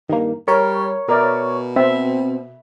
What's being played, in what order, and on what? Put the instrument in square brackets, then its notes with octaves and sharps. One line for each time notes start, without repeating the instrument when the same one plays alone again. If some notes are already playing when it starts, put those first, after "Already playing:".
[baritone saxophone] G2 [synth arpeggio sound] D#3 A#3
[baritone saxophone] G3 [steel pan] A#4 [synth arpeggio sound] C#5
[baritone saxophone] B2 [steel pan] A#4 D5 E5
[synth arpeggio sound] C4 [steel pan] E5